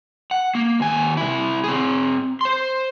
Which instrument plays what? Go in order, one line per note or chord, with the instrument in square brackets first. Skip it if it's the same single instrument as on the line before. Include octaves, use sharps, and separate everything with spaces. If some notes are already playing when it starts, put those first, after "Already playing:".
[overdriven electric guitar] F#5
A#3
D#2 G#5
C3 E4
C4 G#4
C5 C6